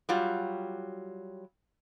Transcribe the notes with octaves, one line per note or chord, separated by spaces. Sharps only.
F#3 G3 F4